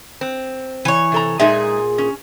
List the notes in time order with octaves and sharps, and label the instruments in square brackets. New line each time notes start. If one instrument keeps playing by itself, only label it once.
[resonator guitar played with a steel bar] C4
[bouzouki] E3 C#5
[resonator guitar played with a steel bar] C3 A4 A#5
[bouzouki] A#2 G#4 [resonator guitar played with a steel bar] G#3 D#4 E5
[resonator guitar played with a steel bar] C#4